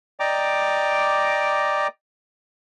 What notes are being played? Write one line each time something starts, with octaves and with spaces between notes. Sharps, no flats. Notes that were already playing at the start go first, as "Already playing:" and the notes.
D5 D#5 G5 A#5 D6